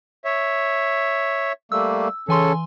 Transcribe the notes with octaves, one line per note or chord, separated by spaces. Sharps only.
C#5 E5
G3 A3 A#3 E6
C#3 E3 C#4 A4 G#5 C6